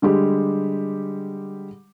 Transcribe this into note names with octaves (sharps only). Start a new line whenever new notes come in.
D3 G3 G#3 G4